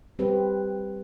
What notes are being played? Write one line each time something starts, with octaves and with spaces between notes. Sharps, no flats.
G3 C4 G4 B4